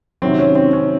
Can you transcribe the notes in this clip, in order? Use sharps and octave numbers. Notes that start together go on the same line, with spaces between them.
C3 D#3 F#3 C4
C#4
C4
C#4